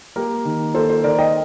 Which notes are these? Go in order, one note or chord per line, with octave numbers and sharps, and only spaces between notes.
A#3 G4 A#4
D#3
A#3 A4 C5
A4 C5
D#3 A#4 D5
D#5 G5